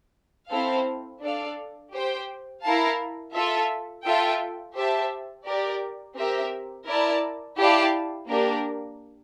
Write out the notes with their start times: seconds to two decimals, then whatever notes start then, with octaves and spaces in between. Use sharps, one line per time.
0.51 C4 E4 A4 C5 F5
1.21 D4 A4 D5 F5
1.92 G4 C5 G5
2.63 E4 A#4 F5 A5
3.34 F4 A4 E5
4.04 F4 A4 E5 G5
4.75 G4 C5 E5 A5
5.46 G4 A#4 D5
6.16 C4 G4 A#4 E5
6.87 E4 A#4 D5 A5
7.58 E4 G4 D5 F5 A5
8.28 A#3 D4 G4 A#4